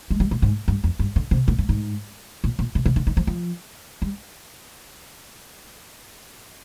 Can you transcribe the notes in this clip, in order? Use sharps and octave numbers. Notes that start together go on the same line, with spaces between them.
G#3
G3
A#2
G#2
G2
F2
G2
D3
C3
A#2
G2
G#2
A#2
A#2
C3
C3
D3
D#3
F3
F3
G3